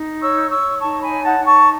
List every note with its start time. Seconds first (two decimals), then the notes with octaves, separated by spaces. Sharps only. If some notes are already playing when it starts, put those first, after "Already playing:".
Already playing: D#4
0.21 C#5 C#6 E6
0.50 C#5 C#6 E6
0.80 D#4 A5 C#6
1.02 G#5 B5
1.09 C#5
1.24 F#5 A5
1.39 D#4
1.46 A5 C#6